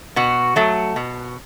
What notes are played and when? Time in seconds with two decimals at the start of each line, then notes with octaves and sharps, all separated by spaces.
0.16 B2 F#4
0.56 F#3 A3
0.96 B2